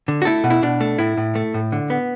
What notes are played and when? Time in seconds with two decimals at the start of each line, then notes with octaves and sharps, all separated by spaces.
0.08 D3
0.22 F#4
0.25 A3 E4 A4
0.44 B2
0.50 E4
0.62 B2 D4
0.81 A3
0.99 A2 E4
1.17 A2
1.35 A3
1.54 A2
1.72 D3
1.90 B3